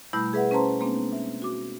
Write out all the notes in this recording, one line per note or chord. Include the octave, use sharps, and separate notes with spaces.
B2 G3 A3 E4 B5 G6
G#4 B4 E5 F#5
C#4 B4 C5 A5 A#5 C6
G#3 A#3 C4 D4
E5
F#4 D6